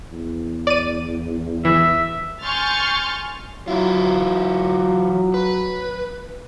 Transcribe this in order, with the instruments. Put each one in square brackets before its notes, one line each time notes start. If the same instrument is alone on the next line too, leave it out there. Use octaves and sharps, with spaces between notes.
[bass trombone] E2
[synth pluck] D5 D#7
[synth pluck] E3 [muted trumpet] E5
[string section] G#5 C6 C#6 F6 G6 A6
[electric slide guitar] E3 E4 F4 [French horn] F#3
[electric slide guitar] B4